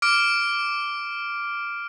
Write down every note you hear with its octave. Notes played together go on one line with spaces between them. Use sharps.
D6 F6 D7